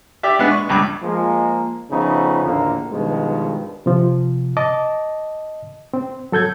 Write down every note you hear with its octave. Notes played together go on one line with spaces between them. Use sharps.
G4 D5 E5
G#3 B3 D4
C#6
C#2 G2 D6
F3 G#3 A#3
F2 C#3 F3 A3 B3 D#4
A#1 D#2 A2 D3 A#3
G2 B2 D#3 F3 G#3
C3 F3
D#5 A5 D6
C4
F#3 A4 G6 G#6